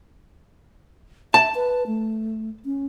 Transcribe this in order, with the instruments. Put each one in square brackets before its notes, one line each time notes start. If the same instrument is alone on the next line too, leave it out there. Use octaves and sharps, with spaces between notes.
[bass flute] E5 [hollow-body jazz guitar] A5
[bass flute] B4
A3
C#4